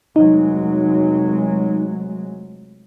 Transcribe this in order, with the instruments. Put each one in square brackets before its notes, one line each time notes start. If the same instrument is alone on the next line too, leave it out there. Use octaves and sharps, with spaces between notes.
[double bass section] F1 F#3 G#3 [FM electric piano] D#4